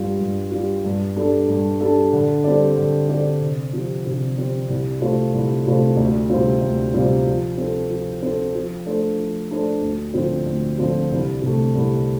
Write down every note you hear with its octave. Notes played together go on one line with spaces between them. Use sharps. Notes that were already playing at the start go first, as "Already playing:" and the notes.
Already playing: G2 G3 F4
G2
G3 F4
G2
G3 D4 A4
G2
G3 D4 A4
D3
G3 C4 A4 D5
D3
G3 C4 A4 D5
C3
F3 C4 G4
C3
F3 C4 G4
C2
C3 A3 F4 C5
C2
C3 A3 F4 C5
D2
C3 G3 C4 F4
D2
C3 G3 C4 F4
F3
C4 A4
F3
C4 A4
F3
A3 D4 A4 C5
F3
A3 D4 A4 C5
D2
D3 F3 C4 F4
D2
D3 F3 C4 F4
C2
C3 A3
C2